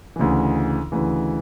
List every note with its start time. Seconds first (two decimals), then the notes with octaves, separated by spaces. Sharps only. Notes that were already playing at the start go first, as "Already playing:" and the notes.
0.16 D2 C#3 E3
0.92 D2 C#3 E3